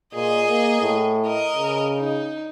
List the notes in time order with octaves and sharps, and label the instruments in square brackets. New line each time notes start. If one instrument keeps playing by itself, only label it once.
[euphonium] A#2 [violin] G#4 D#5
[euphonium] A#3
A2
[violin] A#4 D#5
[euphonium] C#3
[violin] D#4